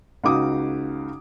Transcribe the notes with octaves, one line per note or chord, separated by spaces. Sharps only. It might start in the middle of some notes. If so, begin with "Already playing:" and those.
C#2 C#3 D#4 F#4 D6 D#6